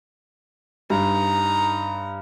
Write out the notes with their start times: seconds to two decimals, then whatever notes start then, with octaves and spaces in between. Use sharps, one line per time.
0.90 G2 D#4 A#5